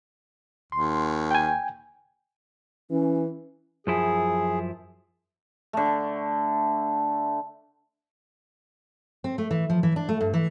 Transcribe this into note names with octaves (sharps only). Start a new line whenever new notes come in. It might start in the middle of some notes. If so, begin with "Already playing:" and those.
D#2 C6
G5 G#5
E3 C#4
F#2 F3 E4 G#4
D3 A3
C4
A3
E3
F3
E3
D4
A3
G2
E3